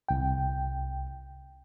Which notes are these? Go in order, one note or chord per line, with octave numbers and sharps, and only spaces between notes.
C2 G5